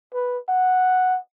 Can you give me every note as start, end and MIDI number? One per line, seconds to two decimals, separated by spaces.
0.14 0.38 71
0.49 1.18 78